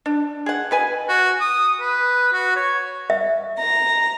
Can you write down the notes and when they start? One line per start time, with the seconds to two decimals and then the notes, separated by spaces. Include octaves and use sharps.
0.06 D4
0.46 G#4 F#5
0.71 B2 B4 G#5
1.09 F#4
1.41 D#6
1.81 B4
2.33 F#4
2.56 C#5
3.10 E5
3.59 A#5